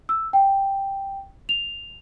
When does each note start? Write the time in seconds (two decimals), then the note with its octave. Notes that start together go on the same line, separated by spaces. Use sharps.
0.09 E6
0.33 G5
1.49 F7